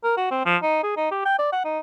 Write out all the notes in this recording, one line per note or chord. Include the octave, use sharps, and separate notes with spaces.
A#4
F#4
C4
F3
D#4
G#4
D#4
G4
G5
D5
F#5
D#4